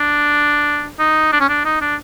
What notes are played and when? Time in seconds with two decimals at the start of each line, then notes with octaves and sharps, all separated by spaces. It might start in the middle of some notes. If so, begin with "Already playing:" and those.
Already playing: D4
0.99 D#4
1.32 D4
1.41 C#4
1.49 D4
1.65 D#4
1.81 D4